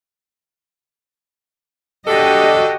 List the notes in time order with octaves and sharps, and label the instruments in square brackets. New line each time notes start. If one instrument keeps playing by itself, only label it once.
[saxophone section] D3 D4 A4 [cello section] F#4 G4 D#5